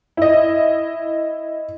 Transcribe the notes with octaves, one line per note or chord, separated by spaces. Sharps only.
E4 D#5